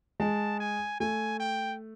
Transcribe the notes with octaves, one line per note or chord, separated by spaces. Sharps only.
G#3 A5
G#5
A3 G#5
G5